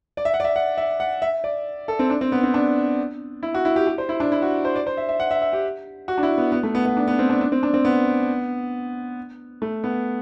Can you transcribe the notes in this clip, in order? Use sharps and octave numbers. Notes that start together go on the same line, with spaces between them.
D5
E5
F#5
D5
E5
F#5
E5
F#5
E5
D5
A4
C4
D4
C4
B3
C4
D4
E4
F#4
E4
G4
G4
C5
E4
D4
E4
F#4
C5
D5
C5
E5
E5
F#5
E5
E5
G4
F#4
D4
E4
B3
B3
A3
B3
B3
D4
B3
C4
D4
D4
C4
D4
C4
B3
A3
B3